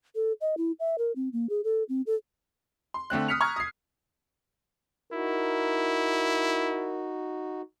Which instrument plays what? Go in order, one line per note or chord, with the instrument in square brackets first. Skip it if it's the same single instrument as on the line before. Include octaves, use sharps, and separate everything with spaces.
[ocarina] A4
D#5
E4
E5
A#4
C4
A#3
G#4
A4
C4
A4
[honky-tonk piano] C6
D3 A3 C4 F#6
D#6 F6 B6 C#7 F7
A#5 C#6 D#6 F6 G#6
D#6 C7
[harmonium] D#4 F#4 [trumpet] E4 [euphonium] A#4